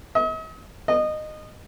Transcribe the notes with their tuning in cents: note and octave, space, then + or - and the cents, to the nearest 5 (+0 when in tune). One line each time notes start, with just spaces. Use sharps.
D#5 +45
D#5 -20